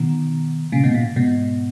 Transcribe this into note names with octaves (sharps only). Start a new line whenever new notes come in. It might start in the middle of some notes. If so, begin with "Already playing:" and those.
Already playing: B2 D#3
A#2 C#3
G#2 B2
A#2
G#2 B2